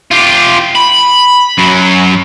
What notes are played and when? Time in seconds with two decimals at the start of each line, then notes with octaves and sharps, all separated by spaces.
0.11 F4 G4
0.75 B5
1.58 F#2 F#3